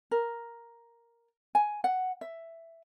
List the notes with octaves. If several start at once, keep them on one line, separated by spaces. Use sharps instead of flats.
A#4
G#5
F#5
E5